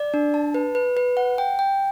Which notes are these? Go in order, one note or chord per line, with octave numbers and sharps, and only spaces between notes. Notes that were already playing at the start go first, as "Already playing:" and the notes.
Already playing: D5
D4
A5
B4
B4
B4
F#5
G5
G5